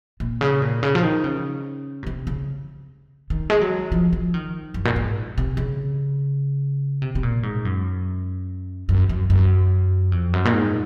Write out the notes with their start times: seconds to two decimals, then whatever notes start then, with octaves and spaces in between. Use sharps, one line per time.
0.20 A#2
0.41 C#3
0.62 A#2
0.83 C#3
0.95 F3
1.03 D#3
1.24 C#3
2.03 A#2
2.07 C3
2.27 C#3
3.30 D#3
3.50 G#3
3.61 F#3
3.92 F3
4.13 F3
4.34 D#3
4.74 F#2
4.85 A#2
4.96 G#2
5.38 C3
5.57 C#3
7.02 C3
7.15 C3
7.23 A#2
7.43 G#2
7.65 F#2
8.89 F#2
9.09 F#2
9.30 F#2
10.12 F2
10.33 F#2
10.45 A#2
10.53 G#2